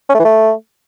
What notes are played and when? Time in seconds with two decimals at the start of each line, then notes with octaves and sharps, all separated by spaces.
0.09 C#4
0.14 A3
0.20 E3
0.25 A3